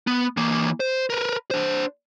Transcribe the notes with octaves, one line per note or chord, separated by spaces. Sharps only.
B3
E3 A#3
C5
A#4 B4
D4 C5